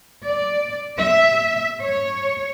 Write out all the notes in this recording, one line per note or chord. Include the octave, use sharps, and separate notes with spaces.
D5
E5
C#5